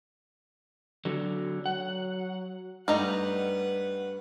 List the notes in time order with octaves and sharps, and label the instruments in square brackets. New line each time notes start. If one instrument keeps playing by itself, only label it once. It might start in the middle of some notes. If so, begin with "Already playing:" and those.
[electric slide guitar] D3 F#3
[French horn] F#3 [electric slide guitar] F#5
[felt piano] G2 A3 [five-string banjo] G3 D#4 A#5 [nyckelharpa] B4 F#5